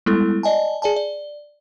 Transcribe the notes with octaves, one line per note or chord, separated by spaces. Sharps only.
G3 G#3 B3 E4 A4
D5 D#5 G#5 A5
G#4 D5 G#5 A5
D5